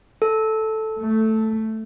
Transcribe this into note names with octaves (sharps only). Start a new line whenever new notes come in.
A4
A3